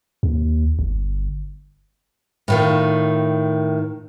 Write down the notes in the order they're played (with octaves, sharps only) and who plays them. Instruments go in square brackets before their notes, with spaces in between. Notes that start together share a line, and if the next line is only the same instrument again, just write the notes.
[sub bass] D#2
G1
[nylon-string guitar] A2 D#3 F4